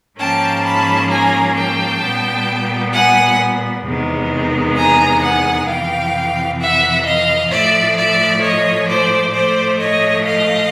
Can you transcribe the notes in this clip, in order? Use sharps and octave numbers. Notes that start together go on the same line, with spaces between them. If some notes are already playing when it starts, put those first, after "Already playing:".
G#2 F3 A#3 C#4 G5 A5
A5 B5
G#5 A#5
G5 A5
A#2 G3 B3
F#5 G#5
E2 C3 D#3 G#3 B3
G#5 A#5
F#5 G#5
F2 C3 E3 F5 G5
E5 F#5
D#5 F5
A2 F3 A3 D5 E5
D5 E5
C#5 D#5
C5 D5
A2 F3 A3 C5 D5
C#5 D#5
D#5 F5